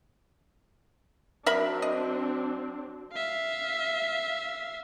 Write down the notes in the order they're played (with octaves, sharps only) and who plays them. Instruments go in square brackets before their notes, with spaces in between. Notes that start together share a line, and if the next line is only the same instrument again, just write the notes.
[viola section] F#3 C4 D4 [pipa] A#4 E5 B5
[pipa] D#5
[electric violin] E5 F5